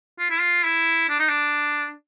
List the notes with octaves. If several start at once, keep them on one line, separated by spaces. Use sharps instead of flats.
F4
E4
F4
E4
D4
D#4
D4